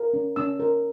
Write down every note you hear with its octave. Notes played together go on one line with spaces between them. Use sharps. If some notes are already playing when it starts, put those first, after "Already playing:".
Already playing: A#4
C#4
C#4 E6
A#4